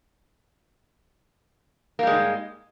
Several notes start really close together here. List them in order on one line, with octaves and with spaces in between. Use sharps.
A#3 G3 G#3 G#2